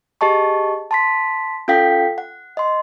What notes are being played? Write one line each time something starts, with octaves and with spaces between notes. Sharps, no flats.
G4 G#4 D#5 A5 C#6
A5 C6 B6
C#4 F4 A4 F5 G5 B6
F#5
D#5 C6